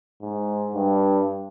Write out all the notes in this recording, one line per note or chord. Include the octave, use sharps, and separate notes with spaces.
G#2
G2